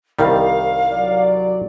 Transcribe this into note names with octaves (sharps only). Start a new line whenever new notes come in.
C2 D#3 G3 F5
F#3 D5